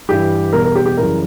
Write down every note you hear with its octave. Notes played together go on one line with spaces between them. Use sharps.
G2 E3 G3 G4
E2 B2 G3 A#4
A#4
G4
G4
F#2 C#3 E3 G3 A#4